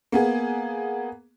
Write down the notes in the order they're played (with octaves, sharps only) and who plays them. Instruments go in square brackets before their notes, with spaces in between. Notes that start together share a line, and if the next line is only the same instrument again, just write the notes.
[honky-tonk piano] A#3 B3 G#4